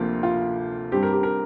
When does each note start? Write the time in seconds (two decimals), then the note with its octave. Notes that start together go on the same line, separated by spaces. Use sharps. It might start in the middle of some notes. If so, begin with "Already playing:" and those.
Already playing: D2 C3 F3 A#3 F4
0.23 F4
0.92 G2 G3 C4 G4
1.03 A#4
1.13 G4
1.23 A#4